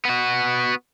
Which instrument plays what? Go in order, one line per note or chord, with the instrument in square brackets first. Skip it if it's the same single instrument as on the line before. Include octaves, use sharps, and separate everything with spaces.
[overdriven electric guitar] B3 F#4